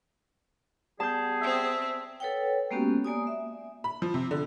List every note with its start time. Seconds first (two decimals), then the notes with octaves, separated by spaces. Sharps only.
1.00 G3 B3 G#4 A5 G6
1.41 C4 E5
2.20 A4 B4 C#5 F#5 G5
2.71 G#3 A#3 B3 C#4 F#4 G4
3.04 A#3 D5 G#5 D#6
3.27 E5
3.84 B5
4.02 F3
4.14 C3
4.31 D3